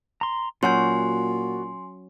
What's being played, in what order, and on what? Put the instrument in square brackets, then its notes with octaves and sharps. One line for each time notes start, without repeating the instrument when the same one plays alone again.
[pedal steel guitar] A#5 C6
[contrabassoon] A#2 [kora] F#3 C#4 [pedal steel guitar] F4 F#4 G6 [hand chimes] G#5 C6